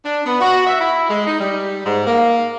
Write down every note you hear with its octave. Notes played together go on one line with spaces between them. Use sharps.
D4
B3
F#4
E5
E4
G#3
D#4
G3
G#2
A#3